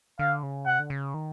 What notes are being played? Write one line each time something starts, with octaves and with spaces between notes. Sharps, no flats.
D3 F5
C#3
C3 F#5
D3
C#3
D#3